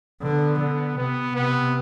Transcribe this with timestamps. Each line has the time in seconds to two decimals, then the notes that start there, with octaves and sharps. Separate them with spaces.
0.22 D3 B3
0.60 D3
0.97 C3 B3
1.35 C3 B3